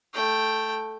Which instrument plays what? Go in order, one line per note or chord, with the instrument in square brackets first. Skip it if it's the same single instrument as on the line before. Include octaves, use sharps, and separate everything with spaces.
[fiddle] A3 G5